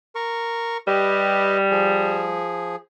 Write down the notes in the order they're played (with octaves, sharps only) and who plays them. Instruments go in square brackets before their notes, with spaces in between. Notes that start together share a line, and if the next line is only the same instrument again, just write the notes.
[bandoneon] A#4 C#6
[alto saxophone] G3 [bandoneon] G4 B4 D#5
[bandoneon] F3 G#4